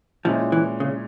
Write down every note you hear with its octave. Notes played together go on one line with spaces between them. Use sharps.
A#2 F3 G#3 C#4 E4
E3
C#3